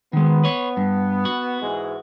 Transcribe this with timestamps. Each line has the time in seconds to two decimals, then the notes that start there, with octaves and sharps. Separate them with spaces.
0.13 D#3 G#3 B3
0.44 B4 C#5
0.77 G2
1.25 F#4
1.61 G#2 E3 G#3